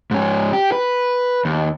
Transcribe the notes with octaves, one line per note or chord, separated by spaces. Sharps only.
G#2 C#4
G4
B4
D#2